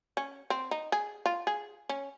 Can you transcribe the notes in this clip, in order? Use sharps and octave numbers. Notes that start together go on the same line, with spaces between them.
C#4
C4
D#4
G#4
F4
G#4
C#4